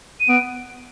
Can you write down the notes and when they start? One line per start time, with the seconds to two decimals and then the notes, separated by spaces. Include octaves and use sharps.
0.20 D#7
0.29 B3 D7